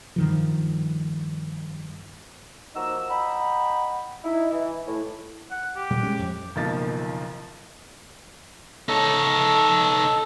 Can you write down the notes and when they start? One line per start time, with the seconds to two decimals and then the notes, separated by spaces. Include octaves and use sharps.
0.16 G2 D#3 F3
2.75 F3 A#3 D#4 F#4 A#5 E6
3.10 D#5 F#5 G5 A#5 B5
4.24 D#4 E4
4.52 E3
4.87 A2
5.51 F#5
5.76 G4
5.90 A#2 G3
6.03 G#3 C#4
6.19 F2
6.56 F#1 B1 D#3 F3 A#3 A6
8.89 D#4 A4 C#5